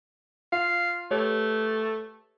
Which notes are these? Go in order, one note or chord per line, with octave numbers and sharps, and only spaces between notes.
F4 F5
A3 G4 B4 C#5